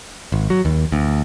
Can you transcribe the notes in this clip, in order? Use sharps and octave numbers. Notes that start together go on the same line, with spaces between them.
G#1
F#3
D#2
D2